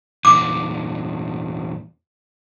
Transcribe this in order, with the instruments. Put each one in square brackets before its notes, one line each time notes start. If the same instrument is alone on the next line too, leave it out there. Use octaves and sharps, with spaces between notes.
[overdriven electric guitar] E2 A#2 [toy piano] D6